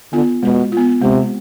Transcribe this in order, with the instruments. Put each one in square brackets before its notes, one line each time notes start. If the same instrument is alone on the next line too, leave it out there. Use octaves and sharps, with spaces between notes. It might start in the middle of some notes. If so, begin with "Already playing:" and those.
[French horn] D3 [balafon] B3 F4
[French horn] B2 [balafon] G#3
[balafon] F4
B3
[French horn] C3 [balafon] G#3